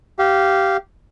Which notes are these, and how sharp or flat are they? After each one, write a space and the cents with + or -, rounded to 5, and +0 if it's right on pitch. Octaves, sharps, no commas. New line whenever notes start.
G4 -15 F5 -10